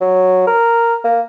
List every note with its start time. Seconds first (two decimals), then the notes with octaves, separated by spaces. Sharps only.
0.01 F#3
0.47 A#4
1.04 A#3